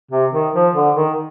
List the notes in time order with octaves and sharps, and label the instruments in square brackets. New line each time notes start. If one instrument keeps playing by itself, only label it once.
[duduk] C3
D#3
F3
D3
D#3